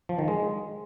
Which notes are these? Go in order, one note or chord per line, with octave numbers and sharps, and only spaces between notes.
F3
D#3
G#3